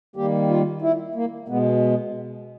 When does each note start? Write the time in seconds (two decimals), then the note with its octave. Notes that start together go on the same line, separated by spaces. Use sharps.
0.16 D#3 G3 A#3 G4
0.49 F4
0.82 E4
1.15 A#3
1.48 B2 G#3 B3